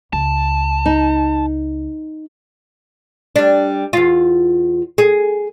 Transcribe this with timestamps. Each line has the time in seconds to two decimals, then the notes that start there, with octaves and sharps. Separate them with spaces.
0.13 C#2 A5
0.86 D#4
3.36 G3 D4
3.93 E2 F4
4.98 G#4